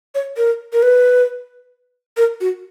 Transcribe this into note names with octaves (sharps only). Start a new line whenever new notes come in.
C#5
A#4
A#4
B4
A#4
F#4